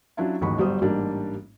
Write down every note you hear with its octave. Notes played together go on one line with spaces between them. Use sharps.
F#3 C#4 D4 E4 F4
A1 D#2 G#2 F#3 B5 C#6
G1 F#3 G3 C5 D#6
A1 G#2 G3 A#3 D4 A5